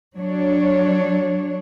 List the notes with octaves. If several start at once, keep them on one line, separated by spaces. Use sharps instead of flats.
F#3 D4 C#5